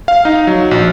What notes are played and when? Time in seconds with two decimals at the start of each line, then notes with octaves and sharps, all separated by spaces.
0.08 F5
0.25 D#4
0.47 F#3
0.71 A#1